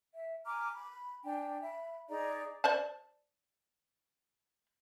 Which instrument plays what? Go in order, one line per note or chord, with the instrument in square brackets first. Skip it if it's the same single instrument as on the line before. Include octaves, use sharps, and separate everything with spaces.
[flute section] E5
G#5 A#5 D6 F6
B5
D4 G5 G#5
E5 B5
D#4 G#4 D5 A#5
[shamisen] C5 D5 A5